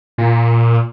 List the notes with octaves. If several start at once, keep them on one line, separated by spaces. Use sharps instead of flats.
A#2